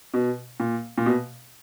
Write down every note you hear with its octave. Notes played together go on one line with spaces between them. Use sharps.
B2
A#2
A#2
B2